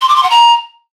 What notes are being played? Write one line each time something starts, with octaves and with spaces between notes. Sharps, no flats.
C6
D6
C6
F#5
A#5